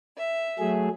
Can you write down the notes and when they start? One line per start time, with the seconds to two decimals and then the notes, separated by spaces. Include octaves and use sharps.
0.18 E5
0.59 F#3 A3 G#4